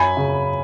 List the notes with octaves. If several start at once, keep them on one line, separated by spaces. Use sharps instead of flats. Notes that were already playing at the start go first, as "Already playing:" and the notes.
Already playing: F#2 G#5 B5
C#3